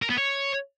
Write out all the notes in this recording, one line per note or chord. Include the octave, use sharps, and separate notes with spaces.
A#4
B3
C#5